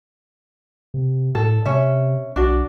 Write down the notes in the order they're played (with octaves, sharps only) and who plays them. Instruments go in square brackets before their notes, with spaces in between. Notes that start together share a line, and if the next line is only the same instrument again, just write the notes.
[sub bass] C3
[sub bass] A2 [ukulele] A4
[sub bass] C3 [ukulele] C#4 E5
[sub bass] B1 [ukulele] D4 F#4